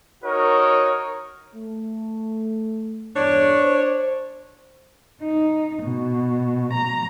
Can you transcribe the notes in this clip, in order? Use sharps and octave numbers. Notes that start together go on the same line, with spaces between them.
D#4 F#4 A#4 C#5
A3
E2 G2 D4 C#5
C5
D#4
B2
A#5